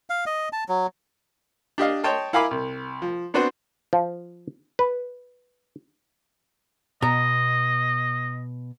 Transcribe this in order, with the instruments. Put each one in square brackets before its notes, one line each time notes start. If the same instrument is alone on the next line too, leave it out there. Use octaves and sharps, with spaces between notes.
[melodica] F5
D#5
A5
F#3
[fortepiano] D4 G4 D#5 F5
C#5 D#5 G5 A5 C6
E4 A#4 F5 G#5 B5 D6
C2
F3
B3 C4 D4 F#4 B4 C5
[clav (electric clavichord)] F3
B4
[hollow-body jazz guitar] B2 A#5 [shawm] D#5